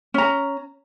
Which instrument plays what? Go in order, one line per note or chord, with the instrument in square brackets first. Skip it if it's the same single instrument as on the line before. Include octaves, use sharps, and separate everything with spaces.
[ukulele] C#4 A#5